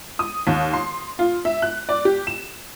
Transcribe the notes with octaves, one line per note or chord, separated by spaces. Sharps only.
D#6
D#2
C6
F4
E5
F#6
D5
G4
E7